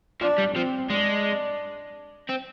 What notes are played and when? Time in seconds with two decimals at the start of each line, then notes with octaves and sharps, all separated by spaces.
0.21 F3 D4
0.38 G3
0.55 F3 C4
0.90 G#3 D4
2.29 C4